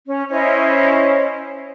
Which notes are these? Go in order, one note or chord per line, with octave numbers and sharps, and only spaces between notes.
C#4
C#4 E4 C5 D#5